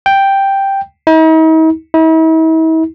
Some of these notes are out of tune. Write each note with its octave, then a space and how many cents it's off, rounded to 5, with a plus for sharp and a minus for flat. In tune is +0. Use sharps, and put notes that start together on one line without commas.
G5 +0
D#4 +45
E4 -45